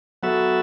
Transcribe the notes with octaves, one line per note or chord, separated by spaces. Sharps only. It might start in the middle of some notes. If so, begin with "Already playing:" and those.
F#3 B3 F#4 A4 E5